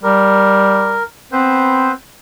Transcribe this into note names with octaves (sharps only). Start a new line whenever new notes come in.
G3 A#4
B3 C4 B4 C5